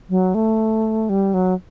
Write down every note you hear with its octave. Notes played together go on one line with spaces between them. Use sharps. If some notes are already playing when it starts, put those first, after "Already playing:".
F#3
A3
G3
F#3